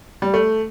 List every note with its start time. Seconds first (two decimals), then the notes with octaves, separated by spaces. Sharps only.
0.22 G3
0.34 A3